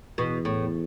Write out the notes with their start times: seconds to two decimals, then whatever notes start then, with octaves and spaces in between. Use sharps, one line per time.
0.18 E2 B2
0.45 A2